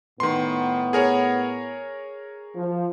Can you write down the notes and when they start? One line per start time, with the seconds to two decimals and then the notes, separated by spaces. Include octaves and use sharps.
0.20 A2 D#3 B3 C6
0.93 G#4 A#4 C#5
2.55 F3